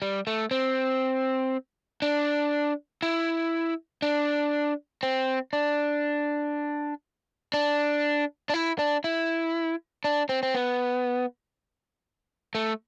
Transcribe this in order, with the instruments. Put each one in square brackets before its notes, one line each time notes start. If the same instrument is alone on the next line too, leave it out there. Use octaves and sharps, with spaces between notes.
[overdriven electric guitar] G3
A3
C4
D4
E4
D4
C4
D4
D4
D4
E4
D4
E4
D4
C4
C4
B3
A3